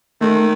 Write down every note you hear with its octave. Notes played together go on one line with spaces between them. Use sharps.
D#3 A3